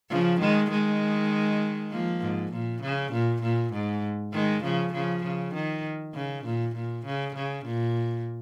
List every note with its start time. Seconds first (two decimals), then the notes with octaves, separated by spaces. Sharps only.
0.10 C#3 F3
0.40 D#3 G#3
0.70 D#3 G#3
1.91 F3 A#3
2.21 G#2
2.52 A#2
2.82 C#3
3.13 A#2
3.42 A#2
3.73 G#2
4.33 D#3 G#3
4.63 C#3 F3
4.93 C#3 F3
5.23 C#3
5.54 D#3
6.14 C#3
6.45 A#2
6.75 A#2
7.05 C#3
7.35 C#3
7.65 A#2